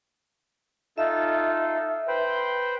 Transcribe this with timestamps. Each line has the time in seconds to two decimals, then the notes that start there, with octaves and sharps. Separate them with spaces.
0.98 D#4 F4 A4 E5
2.08 B4 C5 G5